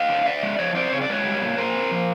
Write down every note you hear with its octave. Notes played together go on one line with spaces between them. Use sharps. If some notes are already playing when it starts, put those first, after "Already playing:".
Already playing: D#5 F5
D3
D3 D5 E5
G#3
F3 C#5 D#5
C4 C5 D5
C#3 C#5
D5
G#3 B4 C#5
G3
A#2
A#2 A#4 C5
C4
F3